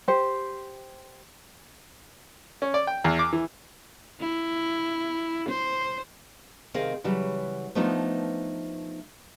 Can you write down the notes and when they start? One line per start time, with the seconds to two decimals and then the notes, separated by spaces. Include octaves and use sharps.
0.08 G4 C5
2.62 C#4
2.74 D5
2.87 G5
3.04 E2
3.19 D6
3.33 E3
4.21 E4
5.49 C5
6.74 C3 D#3 C4 G#4 D#5 F5
7.04 C#3 E3 F#3 G3
7.75 F3 A3 B3 D4 D#4 F4